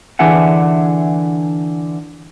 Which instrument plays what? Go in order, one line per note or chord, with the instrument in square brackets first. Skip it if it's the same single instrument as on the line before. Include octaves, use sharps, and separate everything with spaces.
[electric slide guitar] D3 E3 D4 G#4 E5 F#5